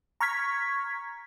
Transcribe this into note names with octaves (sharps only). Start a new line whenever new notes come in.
A#5 C#6 F6 G#6 B6